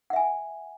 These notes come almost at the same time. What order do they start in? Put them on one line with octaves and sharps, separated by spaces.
F#5 E5 G#5